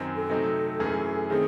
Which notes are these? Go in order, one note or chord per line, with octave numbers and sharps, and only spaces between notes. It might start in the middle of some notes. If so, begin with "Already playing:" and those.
Already playing: F#2 D#3 F#3 C4
A4
C3 F#3 A3 C4 D#4
F#2 E3 A3 C#4 G#4
D#3 A3 C4 G#4